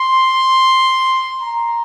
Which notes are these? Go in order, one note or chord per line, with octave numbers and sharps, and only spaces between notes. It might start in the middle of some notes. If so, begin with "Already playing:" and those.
Already playing: C6
A#5